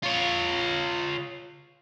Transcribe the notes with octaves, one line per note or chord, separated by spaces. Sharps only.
F4 C#5